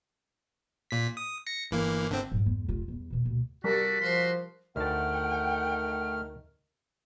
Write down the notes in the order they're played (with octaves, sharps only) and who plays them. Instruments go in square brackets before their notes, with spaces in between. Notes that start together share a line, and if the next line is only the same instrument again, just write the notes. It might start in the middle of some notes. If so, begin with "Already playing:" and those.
[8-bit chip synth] A#2 B6
D#6
A#6 C#7
G1 E3 A#3
G1 D3 C4
[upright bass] G#2 F#3
E2 G#3
F1 F4
E2 G3
B2 E3
D2 B2
[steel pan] G3 A#4 [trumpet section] F#4 A4 D5 [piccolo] B6
[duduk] F3 [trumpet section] F#4 F5 C6
[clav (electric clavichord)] D2 A5 [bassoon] D#3 [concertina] A3 F6 [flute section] F#5 G5